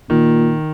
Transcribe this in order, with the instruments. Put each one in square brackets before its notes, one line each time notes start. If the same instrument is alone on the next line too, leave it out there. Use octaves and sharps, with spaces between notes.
[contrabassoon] A#2 [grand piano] D#3